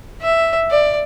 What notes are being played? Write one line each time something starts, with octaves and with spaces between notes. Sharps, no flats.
E5
D5